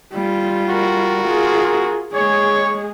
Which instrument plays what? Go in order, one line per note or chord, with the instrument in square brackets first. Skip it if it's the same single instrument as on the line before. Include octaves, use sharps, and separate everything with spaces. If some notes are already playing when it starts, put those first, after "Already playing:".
[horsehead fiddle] G3 F4
[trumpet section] F#4 A#4
[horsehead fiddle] F4 G#4
[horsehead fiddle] G#3 G#4 [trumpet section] C#5